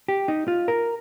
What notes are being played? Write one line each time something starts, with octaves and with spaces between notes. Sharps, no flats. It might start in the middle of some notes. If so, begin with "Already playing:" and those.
G4
D#4
F4
A#4